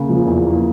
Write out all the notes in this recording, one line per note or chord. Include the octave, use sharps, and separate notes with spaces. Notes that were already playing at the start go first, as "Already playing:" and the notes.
Already playing: C#3 A#3
F3
E2
A#3